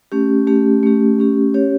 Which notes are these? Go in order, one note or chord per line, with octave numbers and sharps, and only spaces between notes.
A3 C#4 G4
A3 C#4 G4
A3 C#4 G4
A3 C#4 G4
C#4 G4 C#5